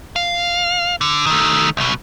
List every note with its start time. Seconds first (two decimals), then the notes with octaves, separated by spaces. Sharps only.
0.16 F5
1.01 D3
1.26 D#3 A3
1.77 C2 B2